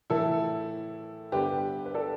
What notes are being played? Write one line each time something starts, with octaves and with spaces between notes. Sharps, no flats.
A2 E3 A3 E4 A4
G2 D3 B3 G4 B4
B4
A4 D5